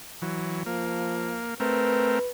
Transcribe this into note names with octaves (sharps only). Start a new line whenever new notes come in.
E3 F#3
F3 A#3
A3 C4 A#4 B4